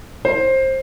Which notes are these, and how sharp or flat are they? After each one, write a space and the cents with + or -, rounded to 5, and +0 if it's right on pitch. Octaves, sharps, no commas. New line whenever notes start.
C5 +20